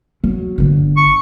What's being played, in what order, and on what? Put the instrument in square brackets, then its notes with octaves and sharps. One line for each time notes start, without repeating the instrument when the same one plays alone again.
[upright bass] F#3
G1 D3
[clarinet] C#6